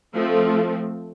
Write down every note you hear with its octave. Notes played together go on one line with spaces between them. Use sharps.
F3 A3 C4